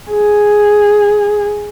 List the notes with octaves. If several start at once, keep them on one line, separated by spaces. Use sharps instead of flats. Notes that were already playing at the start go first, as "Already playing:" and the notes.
G#4